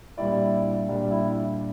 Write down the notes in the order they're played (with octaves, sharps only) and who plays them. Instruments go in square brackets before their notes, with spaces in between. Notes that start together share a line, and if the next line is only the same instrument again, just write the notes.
[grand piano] A#2 G3 D4 G4 D5 [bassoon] E4
[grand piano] A#2 G3 D4 G4 D5
[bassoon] E4